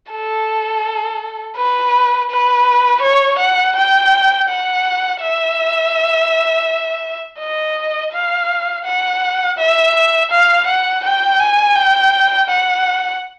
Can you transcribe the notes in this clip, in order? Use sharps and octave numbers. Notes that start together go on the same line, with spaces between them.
A4
B4
B4
C#5
F#5
G5
F#5
E5
D#5
F5
F#5
E5
F5
F#5
G5
G#5
G5
F#5